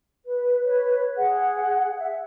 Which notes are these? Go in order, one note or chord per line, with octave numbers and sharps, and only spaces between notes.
B4
B4 C#5
G#4 F#5
E5